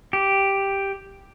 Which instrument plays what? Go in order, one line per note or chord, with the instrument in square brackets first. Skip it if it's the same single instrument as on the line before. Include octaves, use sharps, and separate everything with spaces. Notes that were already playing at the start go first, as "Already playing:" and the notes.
[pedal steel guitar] G4